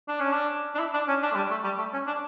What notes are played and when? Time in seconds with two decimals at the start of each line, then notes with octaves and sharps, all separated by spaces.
0.08 D4
0.20 C#4
0.32 D4
0.75 D4
0.79 E4
0.93 D4
1.08 C#4
1.23 D4
1.32 A3
1.36 G3
1.51 A3
1.64 G3
1.78 A3
1.93 C#4
2.07 D4